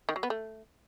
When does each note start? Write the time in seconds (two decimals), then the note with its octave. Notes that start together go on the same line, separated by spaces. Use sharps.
0.09 D#3
0.16 F#3
0.23 B3
0.30 A3